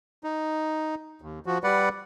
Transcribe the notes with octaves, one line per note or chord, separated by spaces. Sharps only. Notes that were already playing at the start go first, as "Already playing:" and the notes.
D#4
D#2
F3 F#4
G3 B4 D5 F#5